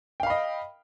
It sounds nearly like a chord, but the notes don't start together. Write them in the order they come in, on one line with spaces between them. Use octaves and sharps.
G5 F5 B5 D#5